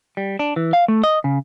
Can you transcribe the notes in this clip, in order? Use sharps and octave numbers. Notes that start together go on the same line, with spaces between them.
G3
D4
E3
F5
A3
D#5
C#3